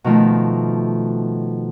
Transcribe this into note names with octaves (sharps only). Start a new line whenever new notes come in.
B2 D#3 F3 A3